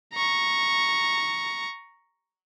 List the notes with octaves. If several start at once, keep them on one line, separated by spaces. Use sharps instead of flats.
A#5 C#6